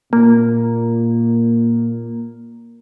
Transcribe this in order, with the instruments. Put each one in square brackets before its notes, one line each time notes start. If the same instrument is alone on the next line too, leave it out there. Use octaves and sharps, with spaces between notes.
[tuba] A#2 [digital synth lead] A#3